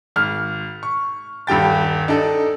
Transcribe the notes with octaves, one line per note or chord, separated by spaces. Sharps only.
G#1 F6
C#6
D#1 G2 G4 G5 A6
D4 D#4 A4